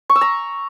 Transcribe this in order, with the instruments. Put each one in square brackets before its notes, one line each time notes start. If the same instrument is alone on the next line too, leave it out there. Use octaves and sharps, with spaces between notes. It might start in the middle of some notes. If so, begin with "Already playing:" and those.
[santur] C#6
E6
A#5